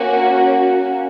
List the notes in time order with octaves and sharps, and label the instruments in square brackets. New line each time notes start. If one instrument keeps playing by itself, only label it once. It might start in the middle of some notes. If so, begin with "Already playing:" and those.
Already playing: [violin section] A#3 C#4 F#4